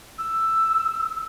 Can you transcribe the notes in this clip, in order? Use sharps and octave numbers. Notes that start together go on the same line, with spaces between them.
E6